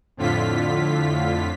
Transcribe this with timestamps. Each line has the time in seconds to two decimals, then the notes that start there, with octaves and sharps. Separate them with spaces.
0.17 F2 A2 D3 F4 B6